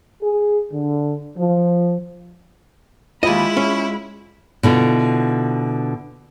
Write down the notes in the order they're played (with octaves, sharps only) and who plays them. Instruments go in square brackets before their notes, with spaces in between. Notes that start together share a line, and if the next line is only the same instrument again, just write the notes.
[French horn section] G#4
D3
F3
[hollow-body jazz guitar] D#2 D#5 [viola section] G#3 B5 [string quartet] E4 [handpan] F4
[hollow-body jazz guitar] C#4
[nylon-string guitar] B2 D3 E4 F4